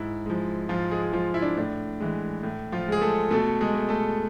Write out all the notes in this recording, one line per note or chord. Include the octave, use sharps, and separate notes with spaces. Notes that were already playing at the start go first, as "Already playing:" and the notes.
Already playing: G#2 E4
F3 G#3
G#2 F3 F4
G#3 G#4
G#4
F3 G#3 F4
E4
D4
A2 D4
E3 G#3
A2
F3 F4
G#3 G#4
A3 A4
B2 A3 A4
G#3 G#4
A3
A3 A4